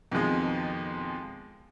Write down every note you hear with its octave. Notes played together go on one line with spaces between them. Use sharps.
F2 B2 D#3 F3 G#3